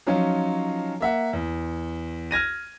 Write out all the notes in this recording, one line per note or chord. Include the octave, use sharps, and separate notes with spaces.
F3 F#3 C#4 D#4 F4
A#3 E5 F#5
E2
F6 G#6 A#6 D#7